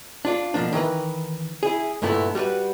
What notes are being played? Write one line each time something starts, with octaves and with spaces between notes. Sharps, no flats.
D4 F4 D5
B2 F3 A#3 D4
D#3 E3 A#4 B4
E4 G#4
G2 A#2 D3 A3 B3 E4
G3 F#4 A#4 B4